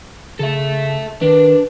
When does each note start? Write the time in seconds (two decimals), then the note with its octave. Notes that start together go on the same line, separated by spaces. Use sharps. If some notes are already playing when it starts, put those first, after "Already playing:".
0.39 C#3 A4 E5
1.21 D#3 D4 B4